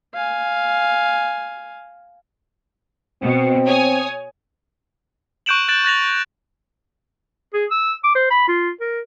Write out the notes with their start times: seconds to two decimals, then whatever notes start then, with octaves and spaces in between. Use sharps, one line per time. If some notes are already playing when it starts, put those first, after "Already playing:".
0.14 F5 G#5
3.22 B2 C4
3.65 C#5 G#5 D#6
5.46 C#6 F#6 G6 D7 E7 F#7
5.68 F#6 A6 D7 E7 F#7
5.84 F#6 A6 A#6 F7
7.54 G#4
7.71 E6
8.04 D6
8.15 C5
8.30 B5
8.48 F4
8.80 A#4